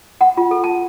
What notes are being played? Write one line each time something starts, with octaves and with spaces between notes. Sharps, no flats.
F#5
F4
A4
A5